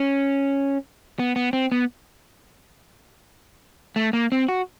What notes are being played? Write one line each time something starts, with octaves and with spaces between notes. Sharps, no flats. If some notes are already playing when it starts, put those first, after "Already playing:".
Already playing: C#4
B3
B3
C4
B3
A3
A#3
C4
F#4